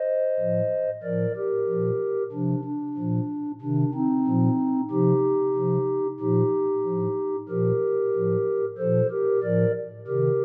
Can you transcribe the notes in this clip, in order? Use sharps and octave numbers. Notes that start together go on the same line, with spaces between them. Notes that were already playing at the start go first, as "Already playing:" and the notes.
Already playing: C5 D#5
A2 F3
A2 F3 A#4 D5
G4 A#4
A#2 F3
C3 F3 D4
D4
A#2 F3
C3 D#3 D4
C4 D#4
A#2 F3
C3 F3 D#4 G4
C3 F3
A#2 F3 D#4 G4
A2 F3
A#2 F3 G4 A#4
A2 F3
A#2 F3 A4 C5
G4 A#4
A2 F3 A#4 D5
C3 D#3 G4 A#4